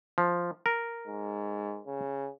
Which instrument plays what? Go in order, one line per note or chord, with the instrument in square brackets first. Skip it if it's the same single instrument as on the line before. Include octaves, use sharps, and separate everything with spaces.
[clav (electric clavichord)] F3
A#4
[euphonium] G#2
C#3